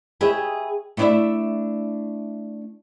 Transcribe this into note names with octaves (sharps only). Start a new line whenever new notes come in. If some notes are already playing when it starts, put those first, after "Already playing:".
G4 G#4 B4 C#5 D#5 E5
A3 B3 D4 E4 D5 E5